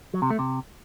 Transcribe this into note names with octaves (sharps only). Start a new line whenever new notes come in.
F#3
C3
A3
C3